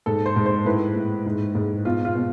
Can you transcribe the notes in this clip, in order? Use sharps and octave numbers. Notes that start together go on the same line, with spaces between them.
G#2 A4
C5
G#2
C5
A2 B4
A2
G#2
G#2
B2 F4
F4
B2